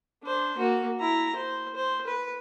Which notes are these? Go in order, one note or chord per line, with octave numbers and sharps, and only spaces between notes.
D4 C5
A#3 F#4
E4 A#5
C5
C5
B4